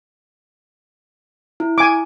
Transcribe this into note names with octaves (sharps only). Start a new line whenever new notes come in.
E4
G#5 D6